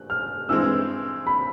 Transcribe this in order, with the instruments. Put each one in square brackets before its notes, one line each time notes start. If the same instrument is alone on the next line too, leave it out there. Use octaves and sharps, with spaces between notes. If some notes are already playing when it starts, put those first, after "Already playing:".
Already playing: [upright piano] F#6
F6
[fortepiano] G2 E3 G#3 C4 [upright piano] E6
[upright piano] B5